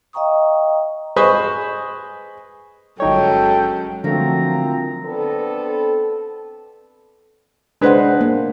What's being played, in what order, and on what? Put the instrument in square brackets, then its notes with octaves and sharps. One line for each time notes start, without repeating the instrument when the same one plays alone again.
[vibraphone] D#5 F5 G5 A#5 C#6 D#6
[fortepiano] G#4 B4 C5 D#5 B5 C#6
[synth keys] G1 D#4 C#5 [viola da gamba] F#3 G#3 C#4 [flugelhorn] A4 [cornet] G5
[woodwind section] A#2 C4 A#5 [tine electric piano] D3 A3 [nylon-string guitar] F3 F#3
[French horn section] B3 C4 D4 A4
[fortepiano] G#3 B4 [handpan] D4 C5 F#5
[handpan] A#3